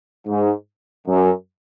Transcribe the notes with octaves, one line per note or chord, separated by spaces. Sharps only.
G#2
F#2